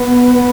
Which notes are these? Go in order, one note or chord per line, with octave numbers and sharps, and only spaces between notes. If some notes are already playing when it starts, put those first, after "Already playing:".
Already playing: B3